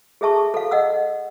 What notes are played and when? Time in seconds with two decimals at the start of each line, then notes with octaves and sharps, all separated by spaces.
0.21 G#4 A4 E5 A5 C#6
0.54 A4 F5
0.71 D#5 F5 F#5 E6